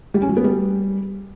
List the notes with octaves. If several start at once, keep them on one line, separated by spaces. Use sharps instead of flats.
G3
C#4
F#3
B3
G3